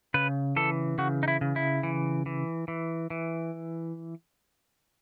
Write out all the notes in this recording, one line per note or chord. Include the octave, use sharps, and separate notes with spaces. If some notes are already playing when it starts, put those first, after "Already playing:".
C#3 B4
E3 A4
C#3 F#4
D#4
E4
C#3
E4
E3
E3
E3
E3